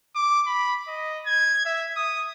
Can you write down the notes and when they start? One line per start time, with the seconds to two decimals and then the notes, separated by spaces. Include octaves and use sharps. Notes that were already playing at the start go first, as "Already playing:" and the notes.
0.15 D6
0.47 B5
0.87 D#5
1.26 G#6
1.65 E5
1.96 D#6